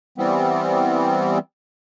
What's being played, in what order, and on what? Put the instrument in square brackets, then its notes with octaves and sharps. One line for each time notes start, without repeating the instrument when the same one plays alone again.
[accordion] E3 G3 B3 C4